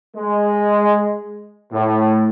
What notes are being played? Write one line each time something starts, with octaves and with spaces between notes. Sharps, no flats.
G#3
A2